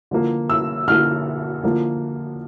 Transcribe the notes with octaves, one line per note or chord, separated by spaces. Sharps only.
D3 F3 A#3
E6
D3 F3 A#3 F6
D3 F3 A#3